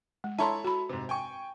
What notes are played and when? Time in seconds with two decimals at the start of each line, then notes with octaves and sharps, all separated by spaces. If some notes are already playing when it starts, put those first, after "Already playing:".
0.24 G#3
0.39 E4 A4 C#5 A5 A#5 C6
0.64 F#4 B5
0.89 G#2 C3
1.09 G5 G#5 C#6